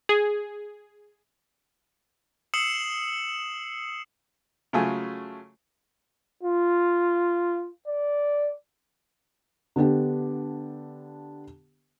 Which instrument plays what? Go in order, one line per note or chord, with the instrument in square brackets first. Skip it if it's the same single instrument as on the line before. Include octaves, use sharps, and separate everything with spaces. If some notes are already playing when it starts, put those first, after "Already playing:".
[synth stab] G#4
[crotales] D#6 E6 C7 C#7 E7 F#7
[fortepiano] C#3 F#3 A3 F4 G#5
[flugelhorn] F4
D5
[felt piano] D3 B3 D4 G4